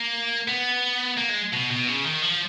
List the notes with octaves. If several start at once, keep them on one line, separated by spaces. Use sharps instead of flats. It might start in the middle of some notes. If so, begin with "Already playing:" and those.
Already playing: A#3
B3
A#3
G#3
B2
B2
C#3
D#3
F3